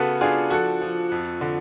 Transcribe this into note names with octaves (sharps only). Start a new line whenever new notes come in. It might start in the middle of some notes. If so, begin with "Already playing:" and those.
Already playing: C#3 B3 F#4 A4
D4 F4 G#4
F3 F#4 A4
F3
F2
D3